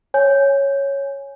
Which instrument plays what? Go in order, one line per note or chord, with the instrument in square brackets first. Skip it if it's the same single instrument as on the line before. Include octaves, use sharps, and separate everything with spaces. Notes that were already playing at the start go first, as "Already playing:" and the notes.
[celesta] C#5 G#5 G6